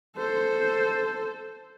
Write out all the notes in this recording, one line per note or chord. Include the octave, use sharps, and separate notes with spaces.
A4 C5